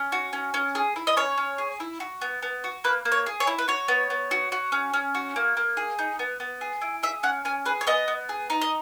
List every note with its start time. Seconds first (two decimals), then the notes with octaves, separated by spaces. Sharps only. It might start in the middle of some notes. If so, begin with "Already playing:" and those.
Already playing: C#4
0.12 F#4
0.33 C#4
0.54 C#4
0.75 G#4
0.96 E4
1.07 D#5
1.17 C#4 C#5
1.37 C#4
1.58 G#4
1.80 E4
2.00 F#4
2.21 B3
2.43 B3
2.64 F#4
2.84 A#3 B4
3.05 A#3
3.12 C#5
3.26 G#4
3.40 C#5
3.47 E4
3.59 B4
3.68 F#4 C#5
3.88 B3
4.10 B3
4.31 F#4
4.52 F#4
4.72 C#4
4.94 C#4
5.15 F#4
5.36 A#3
5.57 A#3
5.77 G#4
5.99 D#4
6.19 B3
6.40 B3
6.61 G#4
6.82 E4
7.03 G#4 E5
7.23 C#4 F#5
7.45 C#4 G#5
7.65 G#4 B4
7.81 C#5
7.87 B3 D#5
8.08 B3
8.29 G#4
8.50 D#4
8.61 D#5